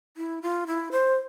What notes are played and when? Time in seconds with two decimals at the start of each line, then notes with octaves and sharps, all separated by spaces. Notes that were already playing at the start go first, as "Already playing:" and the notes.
0.17 E4
0.42 F4
0.67 E4
0.92 C5